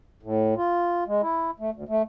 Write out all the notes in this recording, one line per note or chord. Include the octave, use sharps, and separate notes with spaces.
A2
F4
G#3
E4
A3
D2
A3